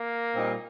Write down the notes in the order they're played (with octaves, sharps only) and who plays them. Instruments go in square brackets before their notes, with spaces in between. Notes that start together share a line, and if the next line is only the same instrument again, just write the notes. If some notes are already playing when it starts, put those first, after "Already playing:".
Already playing: [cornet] A#3
[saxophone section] A#2 G3 C4 D#4